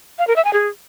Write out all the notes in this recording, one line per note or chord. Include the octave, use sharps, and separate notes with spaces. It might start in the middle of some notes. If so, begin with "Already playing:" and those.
F5
A#4
E5
G#5
G#4